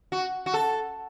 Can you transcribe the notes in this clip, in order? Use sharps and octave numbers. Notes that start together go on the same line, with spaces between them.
F#4
F#4
A4